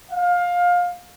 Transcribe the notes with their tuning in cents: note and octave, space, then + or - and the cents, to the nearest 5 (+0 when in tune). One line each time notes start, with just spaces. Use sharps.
F5 +20